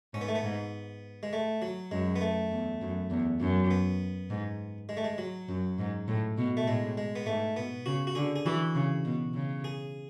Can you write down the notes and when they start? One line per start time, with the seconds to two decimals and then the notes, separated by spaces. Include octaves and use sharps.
0.14 G#2 C#4
0.21 B3
0.28 A3
0.35 B3
0.43 G#2
1.23 G#3
1.33 A3
1.62 F#3
1.91 F#2 G#3
2.16 B3
2.21 A3
2.51 E2
2.81 F#2
3.11 E2
3.40 F#2
3.71 B3
4.30 G#2
4.89 G#3
4.97 A3
5.04 G#3
5.18 F#3
5.48 F#2
5.78 G#2
6.08 A2
6.38 B2
6.57 A3
6.67 A2 G#3
6.98 G#3
7.16 B3
7.26 G#2 A3
7.56 B2 B3
7.86 C#3 F#4
8.07 F#4
8.15 D3 G#4
8.36 G#4
8.46 E3 F#4
8.75 C#3
9.05 B2
9.35 C#3
9.64 G#4